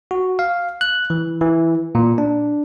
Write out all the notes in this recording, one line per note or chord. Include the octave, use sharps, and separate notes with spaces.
F#4
F5
F#6
E3
E3
A#2
D4